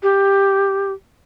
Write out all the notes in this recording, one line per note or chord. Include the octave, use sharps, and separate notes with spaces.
G4